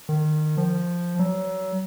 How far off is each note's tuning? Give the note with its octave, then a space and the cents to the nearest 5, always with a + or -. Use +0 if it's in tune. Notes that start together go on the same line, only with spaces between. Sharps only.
D#3 -25
F3 +0
F#3 +30